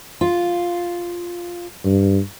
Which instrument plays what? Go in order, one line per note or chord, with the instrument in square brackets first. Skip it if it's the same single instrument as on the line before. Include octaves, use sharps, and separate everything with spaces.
[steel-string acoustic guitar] F4
[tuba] G2